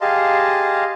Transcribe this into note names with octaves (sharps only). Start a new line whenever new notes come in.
G4 G#4 D#5 F5 A5 C6